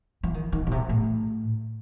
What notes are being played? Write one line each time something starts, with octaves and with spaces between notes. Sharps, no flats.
E3
D#3
D#3
B2
C3
A2